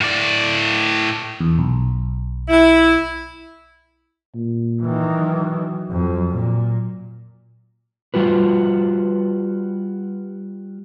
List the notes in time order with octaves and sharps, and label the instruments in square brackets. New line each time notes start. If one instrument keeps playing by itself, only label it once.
[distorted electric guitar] A2 D5
[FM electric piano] E2
B1
[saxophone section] E4
[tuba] A#2
[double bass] D#3 E3
[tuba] F#3
[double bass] F2
A#2
[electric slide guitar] G3 F4 F#4 B4